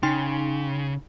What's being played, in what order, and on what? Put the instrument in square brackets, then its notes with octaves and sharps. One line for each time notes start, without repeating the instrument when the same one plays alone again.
[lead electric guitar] C#3 [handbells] D#4 G5 C6